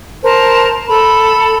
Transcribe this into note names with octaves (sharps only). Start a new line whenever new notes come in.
A#4 C5 A5
A4 B5